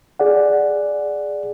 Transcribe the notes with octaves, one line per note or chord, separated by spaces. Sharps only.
G#4 D5 F#5